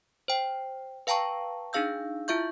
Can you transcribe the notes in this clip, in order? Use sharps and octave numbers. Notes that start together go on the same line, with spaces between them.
C5 G5
B4 F5 G5 A5 A#5 C#6
D4 D#4 G#4 F5 E6 G6
E4 F4 E5 C#6 G6